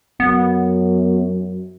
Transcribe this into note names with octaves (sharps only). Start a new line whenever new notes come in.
F#2 B3